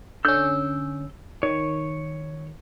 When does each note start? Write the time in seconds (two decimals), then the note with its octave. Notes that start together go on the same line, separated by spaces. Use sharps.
0.25 D3 C#4 E6 G6
1.43 D#3 C#5